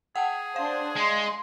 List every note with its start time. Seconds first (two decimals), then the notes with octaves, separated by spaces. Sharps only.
0.16 G#4 F#5 G5 A5
0.56 D4 C5 F5
0.96 G#3 C6